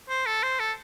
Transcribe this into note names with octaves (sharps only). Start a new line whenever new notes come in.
C5
A4
C5
A4